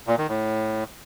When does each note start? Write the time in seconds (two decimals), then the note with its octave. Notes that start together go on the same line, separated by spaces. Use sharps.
0.07 A#2
0.18 D#3
0.29 A2